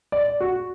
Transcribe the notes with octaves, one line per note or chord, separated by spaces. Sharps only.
D5
F#4